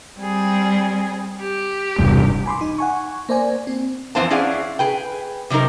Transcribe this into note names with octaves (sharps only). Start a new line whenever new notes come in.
G3 C4 G#4
G4
E1 C2 G2
G#5 B5 C6 D6
D#4
F#5 G#5 C#6
A#3 C5 D5 G#5
C4
F2 E3 C4 C5 F#5 A5
C#4 E4 G#4 D5 F5 F#5
G#4 B4 G5
C3 F#3 C4 D#4 A#4